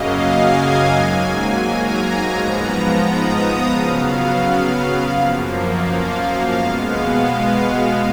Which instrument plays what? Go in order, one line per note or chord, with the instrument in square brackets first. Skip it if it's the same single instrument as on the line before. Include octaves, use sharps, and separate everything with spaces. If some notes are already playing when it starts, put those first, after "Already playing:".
Already playing: [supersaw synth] F#2 C#3 F#3 A#3 D#5 F5
G#5
G#2 F#3 A#3
A#5
G#2 F3 B3 A#5
D#6
C#3 F#3 B3 F5
F#2 F3 A#3
F5
F5
B2 G#3 B3 F5